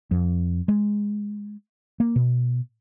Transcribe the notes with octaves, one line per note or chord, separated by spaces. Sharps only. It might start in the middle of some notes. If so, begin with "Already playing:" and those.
F2
G#3
A#3
B2